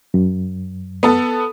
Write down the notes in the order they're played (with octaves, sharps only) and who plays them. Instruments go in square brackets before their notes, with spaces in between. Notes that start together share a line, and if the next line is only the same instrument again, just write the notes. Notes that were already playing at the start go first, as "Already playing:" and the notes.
[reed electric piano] F#2
[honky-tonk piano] B3 A4